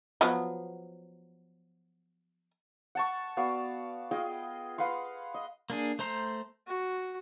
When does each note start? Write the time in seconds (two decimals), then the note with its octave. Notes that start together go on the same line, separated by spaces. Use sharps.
0.21 F3 F#3 B3
2.95 F#5 A5 C#6
3.37 B3 F#4 D5 F5
4.11 F4 G#4 D#5 G5
4.78 B4 F5 F#5 C6
5.34 D#5
5.70 A#3 D4 G#4
5.99 A3 C5 A#5 C6
6.67 F#4